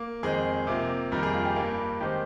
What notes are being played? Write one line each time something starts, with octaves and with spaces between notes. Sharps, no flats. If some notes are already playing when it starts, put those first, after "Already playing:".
Already playing: A#3
F2 D#3 G#3 C4 G#4
C3 F3 A#3
F2 D#3 G3 A#3 A#4
G#4
F4
G4
G2 G3 A#3
D#3 G#3 C4 G4